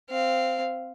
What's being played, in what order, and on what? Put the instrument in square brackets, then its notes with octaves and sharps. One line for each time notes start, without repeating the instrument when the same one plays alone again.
[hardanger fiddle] C4 F5